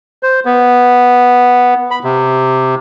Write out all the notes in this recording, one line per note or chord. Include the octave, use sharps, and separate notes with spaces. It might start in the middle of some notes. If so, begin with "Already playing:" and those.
C5
B3
B5
C3